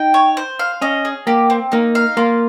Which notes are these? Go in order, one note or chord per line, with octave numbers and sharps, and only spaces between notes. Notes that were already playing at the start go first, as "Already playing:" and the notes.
Already playing: D#4 G5
C#5
C5
F5
C#4 D#5
G#4
A#3 G4
C4
A#3 D#4
F5
A#3 F4